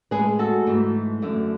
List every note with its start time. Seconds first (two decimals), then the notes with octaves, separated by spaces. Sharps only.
0.11 A2 G#3 G#4 B4
0.39 F#4 A4
0.66 G#2 E3 A3
1.22 F#2 D3 A3